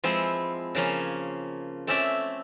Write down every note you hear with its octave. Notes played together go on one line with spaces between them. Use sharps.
F3 G#3 C4 E4
C#3 F3 A#3 C#4
A3 C4 C#4 D5 E5